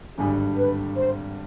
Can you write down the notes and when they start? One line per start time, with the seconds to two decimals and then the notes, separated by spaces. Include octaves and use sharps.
0.17 G#1 G2 D3 G3 G#4
0.58 B4
0.97 C5